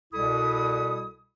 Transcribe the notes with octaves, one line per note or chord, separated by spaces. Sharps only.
C2 B2 G3 E4 A4 D#6